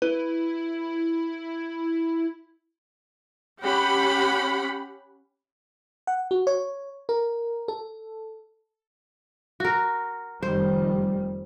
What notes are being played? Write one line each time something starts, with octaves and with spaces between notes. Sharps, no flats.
E4 B4
C#4 G4 F#5 B5
F#5
F#4
C#5
A#4
A4
F#4 A#4
F1 D#3 G3 C5